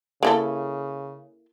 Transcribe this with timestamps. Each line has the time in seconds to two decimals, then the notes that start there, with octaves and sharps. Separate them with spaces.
0.23 C#3 A#3 E4 A4